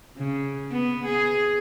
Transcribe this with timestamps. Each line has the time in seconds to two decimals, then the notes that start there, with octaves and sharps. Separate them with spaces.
0.18 C#3
0.71 B3
1.06 G#4